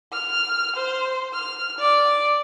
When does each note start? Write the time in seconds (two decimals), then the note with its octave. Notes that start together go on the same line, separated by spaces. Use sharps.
0.13 F6
0.76 C5
1.33 F6
1.78 D5